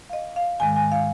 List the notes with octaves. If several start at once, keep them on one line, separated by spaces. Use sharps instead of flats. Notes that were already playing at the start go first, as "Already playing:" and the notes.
F5
D#5
F5
G#2 D#3 G#3 G#5
G#5
F5